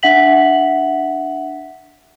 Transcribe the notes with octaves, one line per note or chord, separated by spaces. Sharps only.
D4 E5 F#5 B6 F#7